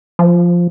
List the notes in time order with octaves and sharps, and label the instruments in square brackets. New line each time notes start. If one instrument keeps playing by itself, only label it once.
[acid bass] F3